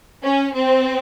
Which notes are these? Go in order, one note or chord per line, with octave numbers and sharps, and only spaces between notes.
C#4
C4